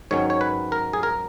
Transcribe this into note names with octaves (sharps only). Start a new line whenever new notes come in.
G#2 D#3 F#3 C#4 C#5
C#5
B4
A#4
G#4
A#4